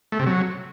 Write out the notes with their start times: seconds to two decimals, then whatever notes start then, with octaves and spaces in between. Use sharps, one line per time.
0.12 A3
0.19 C3
0.26 F#3